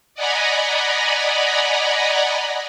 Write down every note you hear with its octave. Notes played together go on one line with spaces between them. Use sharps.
D5 D#5 F#5 G#5 A#5 B5